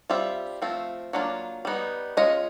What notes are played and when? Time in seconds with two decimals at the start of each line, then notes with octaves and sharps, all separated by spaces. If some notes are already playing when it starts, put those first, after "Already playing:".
0.10 G3 C4 F4 E5
0.62 F3 A3 C4 F4
1.13 F#3 A#3 D4 F4
1.65 G3 B3 D#4
2.17 G#3 C#4 F4 D#5